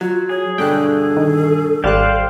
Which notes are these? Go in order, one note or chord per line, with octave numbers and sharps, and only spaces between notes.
F#3 F4
G#4 C#5
G2 B2 D3 A4 G5 F#6
D#3
G#1 G3 C5 D5 F5 G5 F#6